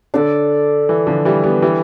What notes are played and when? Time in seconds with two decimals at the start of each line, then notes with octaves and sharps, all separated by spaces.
0.14 D3 D4 A4 D5
0.89 E3
1.07 D3 F3
1.25 E3 G3
1.43 G3 B3
1.62 E3 G3